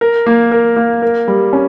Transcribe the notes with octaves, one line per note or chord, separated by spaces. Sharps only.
A#4
A#3
A#4
A#3
A#4
G3
C#4